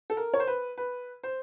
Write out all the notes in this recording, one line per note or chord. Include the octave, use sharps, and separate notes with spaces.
A4
A#4
C#5
C5
B4
B4
C5